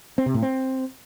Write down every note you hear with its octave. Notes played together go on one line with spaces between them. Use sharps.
C4
C3
A2
C4